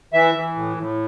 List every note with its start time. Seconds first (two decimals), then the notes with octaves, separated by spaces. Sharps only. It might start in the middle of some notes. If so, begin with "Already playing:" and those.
0.13 E3 E5
0.35 E3
0.56 A2
0.77 A2